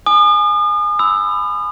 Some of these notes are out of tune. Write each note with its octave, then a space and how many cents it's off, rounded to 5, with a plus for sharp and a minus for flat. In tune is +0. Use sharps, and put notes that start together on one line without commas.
G#5 +10 D#6 -40
B5 +25 E6 -5